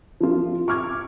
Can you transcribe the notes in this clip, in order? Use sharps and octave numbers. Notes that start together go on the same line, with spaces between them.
F3 F4
C#6 D6 F6 G#6